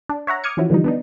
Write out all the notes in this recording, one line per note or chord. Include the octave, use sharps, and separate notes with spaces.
D4
C#5 E5 F#5 A#5
D6 D#6 F6 G#6 C#7
E3 F3 C#4 E4 F#4
D3 E3 F3 G3 D#4
B3 D4 D#4